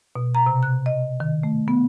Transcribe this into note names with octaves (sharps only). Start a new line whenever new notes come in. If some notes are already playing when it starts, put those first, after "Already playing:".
B2
A#5
C3
F#6
D#5
D#3
A3
B3